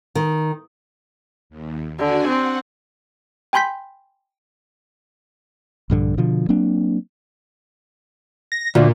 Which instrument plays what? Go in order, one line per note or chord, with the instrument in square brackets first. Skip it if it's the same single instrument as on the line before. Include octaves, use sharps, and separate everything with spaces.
[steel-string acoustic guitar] D#3
[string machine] D#2
[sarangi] D3 [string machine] D4 F#4 G#5
[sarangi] C4 [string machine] F#5
[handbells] G5 G#5 B5 C6 G6 B6
[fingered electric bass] A#1 G2 D3
B2 D3 F3
F#3 A#3 C4 D4
[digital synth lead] A#6
[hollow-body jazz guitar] D2 [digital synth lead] A#2